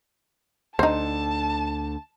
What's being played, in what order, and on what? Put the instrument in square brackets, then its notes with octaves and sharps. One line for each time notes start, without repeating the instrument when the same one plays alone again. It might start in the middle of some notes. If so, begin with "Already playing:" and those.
[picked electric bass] D2 D3 [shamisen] D#4 C5 [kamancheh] A5